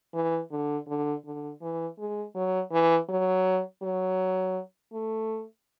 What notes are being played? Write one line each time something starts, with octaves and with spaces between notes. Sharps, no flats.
E3
D3
D3
D3
E3
G#3
F#3
E3
F#3
F#3
A3